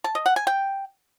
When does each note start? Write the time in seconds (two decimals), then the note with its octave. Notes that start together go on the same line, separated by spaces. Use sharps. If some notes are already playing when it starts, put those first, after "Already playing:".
0.04 A5
0.15 D#5
0.26 F#5
0.36 G#5
0.47 G5